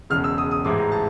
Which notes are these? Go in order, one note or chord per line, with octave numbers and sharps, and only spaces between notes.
E1 E2 C#3 F6
E6
D#6
D#6
A1 G#2 E3 G#3 D6
A#5
A5